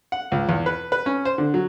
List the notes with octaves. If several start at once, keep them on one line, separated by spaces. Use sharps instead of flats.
F#5
C#2
E2
B4
B4
C#4
C5
D3
F#3